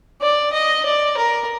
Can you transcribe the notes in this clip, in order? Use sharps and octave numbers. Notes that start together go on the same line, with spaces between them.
D5
D#5
D5
A#4